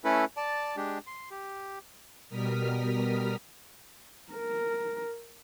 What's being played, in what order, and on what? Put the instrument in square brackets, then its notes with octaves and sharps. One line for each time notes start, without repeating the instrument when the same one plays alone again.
[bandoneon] A3 C#4 E4 A4 B4
D5 A5
G#3 D4 G4
C6
G4
[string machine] B2 G3 A#4 D#6 F6 B6
[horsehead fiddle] A#4